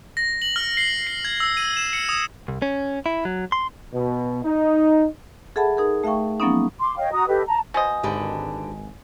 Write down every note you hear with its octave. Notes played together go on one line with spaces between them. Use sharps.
A#6
F#7
F6
C7
C7
G#6
E6
D#7
E7
C#7
D#6
C2
C#4
E4
F#3
C6
B2
D#4
G#4 A4 E5 F#5 A5 B5
D#4 G#4 A#4
A3 E5 F5 G5 C#6
F3 F#3 A#3 B3 C#4 D#4
C6 D6
C#5 D#5 F5 G5
F#4 A#5 D#6
G4 A4 B4 D#5
A5 A#5
B2 C5 D#5 G#5
G#1 D3 G4 B4